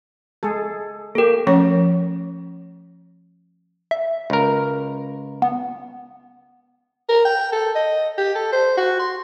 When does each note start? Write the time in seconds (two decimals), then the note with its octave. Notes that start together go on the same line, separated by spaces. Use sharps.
0.43 G#3 G#4 A4
1.15 A#3 G4 A4 A#4
1.47 F3 A3 C#4 C#5
3.91 E5
4.30 C#2 A#4
5.42 B3
7.09 A#4
7.25 G5
7.52 A4
7.75 D#5
8.18 G4
8.35 A4
8.52 C5
8.77 F#4
8.99 C6